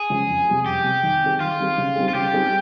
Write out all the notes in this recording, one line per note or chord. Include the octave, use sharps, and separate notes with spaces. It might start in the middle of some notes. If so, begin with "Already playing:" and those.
Already playing: G#4
C#3 F3 G#3
F2
C3 G3
F2 G4
C3 G3
D#3
G3 C4 D#4 G#4
D#3 F4
G3 C4 D#4 G#4
C#3
G3 C4 D#4 G#4
F4
C#3 G4
G3 C4 D#4 G#4